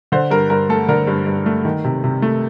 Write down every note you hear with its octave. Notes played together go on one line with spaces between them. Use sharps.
D3 C5
G2 A#4
G2 A#4
A3 A4
D3 A#4
G2
G2
A3
D#3
C3
C3
A3